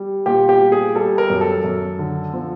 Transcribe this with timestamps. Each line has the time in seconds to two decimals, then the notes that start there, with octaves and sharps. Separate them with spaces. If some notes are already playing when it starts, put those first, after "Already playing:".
Already playing: G3
0.26 A#2 G4
0.49 G4
0.61 G3
0.72 G#4
0.95 G3 A4
1.18 A#4
1.30 F#2
1.41 A4
1.64 F#2
1.99 D3
2.34 F3